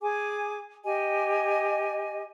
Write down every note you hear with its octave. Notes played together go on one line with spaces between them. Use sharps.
G#4 G#5 D6
G4 D#5 G#5